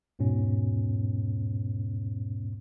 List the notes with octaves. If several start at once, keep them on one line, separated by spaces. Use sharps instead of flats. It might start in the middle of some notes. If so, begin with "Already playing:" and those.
E2 G#2 B2 B3 C#4